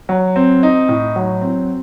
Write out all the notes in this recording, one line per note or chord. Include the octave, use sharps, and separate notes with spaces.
F#3
C4
D#4
A2
F#3
C4